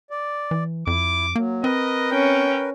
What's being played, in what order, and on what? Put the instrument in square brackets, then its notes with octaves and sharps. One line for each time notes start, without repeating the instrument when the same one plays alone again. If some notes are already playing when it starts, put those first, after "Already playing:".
[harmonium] D5
[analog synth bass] E3
[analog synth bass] F2 [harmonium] E4 [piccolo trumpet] D6
[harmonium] F#3 [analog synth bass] A#3
[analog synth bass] C4 [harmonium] A#4 B4 [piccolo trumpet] D#5
[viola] C#4 [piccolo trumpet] G5